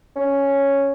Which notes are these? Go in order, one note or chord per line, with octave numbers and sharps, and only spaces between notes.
C#4